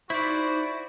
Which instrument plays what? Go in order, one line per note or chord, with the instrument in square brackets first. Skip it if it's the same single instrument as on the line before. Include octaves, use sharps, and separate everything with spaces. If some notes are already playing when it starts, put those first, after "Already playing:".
[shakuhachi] D#4 [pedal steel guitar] E4 D5 [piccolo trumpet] F#4 [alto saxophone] C5